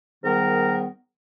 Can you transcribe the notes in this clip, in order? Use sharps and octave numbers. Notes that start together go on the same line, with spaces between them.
G#2 D#3 G3 B3 A#4